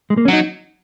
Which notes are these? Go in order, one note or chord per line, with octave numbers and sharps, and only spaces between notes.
G#3
A#3
C#4
F#3 D#4